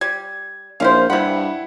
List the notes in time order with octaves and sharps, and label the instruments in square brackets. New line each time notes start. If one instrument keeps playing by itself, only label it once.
[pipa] G3 [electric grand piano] G#6
[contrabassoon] A#1 [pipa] C#4 E4 C5 [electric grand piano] F5
[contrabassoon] G2 [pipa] C3 B5 [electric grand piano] E4 F#5